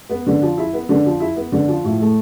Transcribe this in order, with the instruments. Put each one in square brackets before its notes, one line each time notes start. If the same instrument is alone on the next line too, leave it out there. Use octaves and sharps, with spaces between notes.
[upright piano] B3
D3
F3
E4
B3
D3
F3
E4
B3
D3
F3
A2
A3